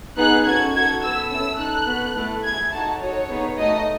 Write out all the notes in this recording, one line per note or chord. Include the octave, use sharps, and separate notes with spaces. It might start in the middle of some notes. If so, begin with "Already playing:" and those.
B3 D#4 G#4 F#6
C#4 F#4 A4 G#6
D#4 F#4 A4 G#6
B3 F#4 A4 E6
C#4 E4 A4 E6
D#4 A4 F#6
B3 F#4 A4
A3 E4 A4
B3 E4 G#4 G#6
D#4 F#4 A4 A5
D#4 F#4 A4 C#5
B3 D#4 G#4
A3 D#4 F#4 A4 D#5